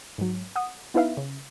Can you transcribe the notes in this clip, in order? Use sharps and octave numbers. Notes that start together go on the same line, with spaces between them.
G#2 F#3
F#5 D#6
B3 D#4 E4 B4 E5 F5
C#3